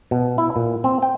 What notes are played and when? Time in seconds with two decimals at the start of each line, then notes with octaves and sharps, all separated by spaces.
0.11 B2
0.38 E4
0.56 A#2
0.84 C4
1.03 G5